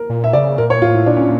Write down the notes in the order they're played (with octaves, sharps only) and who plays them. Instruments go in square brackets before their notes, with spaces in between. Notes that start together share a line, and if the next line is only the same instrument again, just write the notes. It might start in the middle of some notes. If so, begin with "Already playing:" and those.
Already playing: [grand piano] A#4
[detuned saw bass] A#2
[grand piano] E5
[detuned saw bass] C#3 [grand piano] D5
[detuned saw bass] A#2 [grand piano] A#4
[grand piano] C#5
[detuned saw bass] A2 [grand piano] F4
[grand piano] E4
[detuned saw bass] A#2 [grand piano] D4
[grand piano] C#4